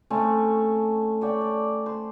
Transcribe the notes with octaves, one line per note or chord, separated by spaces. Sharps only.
A3 C4 C#4
C#5 D5 G5
D5
C5